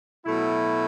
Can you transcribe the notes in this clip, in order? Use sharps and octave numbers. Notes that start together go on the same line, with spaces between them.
B2 F#3 A3 E4